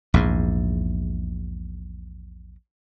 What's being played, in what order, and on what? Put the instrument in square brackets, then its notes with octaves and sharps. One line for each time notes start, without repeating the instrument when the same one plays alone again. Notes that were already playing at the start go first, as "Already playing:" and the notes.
[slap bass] A#1 E2 G#2